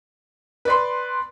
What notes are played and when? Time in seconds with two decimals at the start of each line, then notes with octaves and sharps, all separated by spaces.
0.65 B4 D5 C6